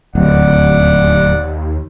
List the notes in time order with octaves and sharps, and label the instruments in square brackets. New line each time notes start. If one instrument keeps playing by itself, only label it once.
[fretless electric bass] D1 [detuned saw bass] D#2 [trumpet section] D5 F#5